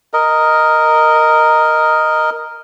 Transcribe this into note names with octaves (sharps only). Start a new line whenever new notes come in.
A#4 D#5